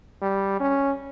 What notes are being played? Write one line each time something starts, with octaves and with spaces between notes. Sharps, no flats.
G3
C#4